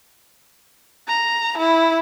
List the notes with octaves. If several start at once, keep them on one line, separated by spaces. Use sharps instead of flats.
A#5
E4